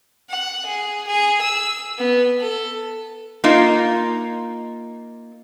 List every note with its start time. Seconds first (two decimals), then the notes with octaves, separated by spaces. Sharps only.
0.30 F#5
0.66 G#4
1.07 G#4
1.41 E6
1.98 B3
2.40 A4
3.44 A#3 D#4 F4